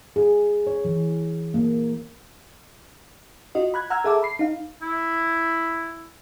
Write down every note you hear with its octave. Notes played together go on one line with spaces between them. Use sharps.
G#4
C#5
E3
A#3
F4 F#4 D#5
B5 F#6 G#6
F#5 A#5 E6 F6 G#6
G#4 A4 E5 A5 D6 E6
B5 C7
D#4 F5
E4